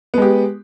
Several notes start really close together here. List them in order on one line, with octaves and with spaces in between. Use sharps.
B3 G#3 G4